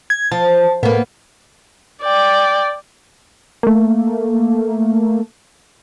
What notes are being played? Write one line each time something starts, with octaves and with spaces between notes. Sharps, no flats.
G#6
F3 A5
A2 A#3 B3
D5 G5
A3 A#3